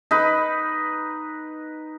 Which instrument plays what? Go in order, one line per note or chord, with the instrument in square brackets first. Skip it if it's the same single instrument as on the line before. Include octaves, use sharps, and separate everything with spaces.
[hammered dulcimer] D#4 B4